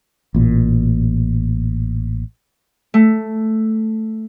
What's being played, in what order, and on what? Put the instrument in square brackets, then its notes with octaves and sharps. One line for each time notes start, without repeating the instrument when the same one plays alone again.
[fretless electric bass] A1 A#2
[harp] A3